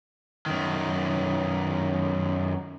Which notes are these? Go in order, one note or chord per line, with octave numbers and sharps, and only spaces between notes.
F#2 D#3